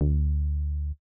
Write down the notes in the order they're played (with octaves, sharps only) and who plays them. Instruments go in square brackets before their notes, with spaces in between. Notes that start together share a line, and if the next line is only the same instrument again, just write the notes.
[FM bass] D2